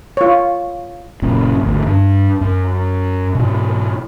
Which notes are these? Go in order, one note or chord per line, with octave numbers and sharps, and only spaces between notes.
F4 C#5
F#1 A#2 C#4
G#1 D2
G2 D4
F#2
G#2 B2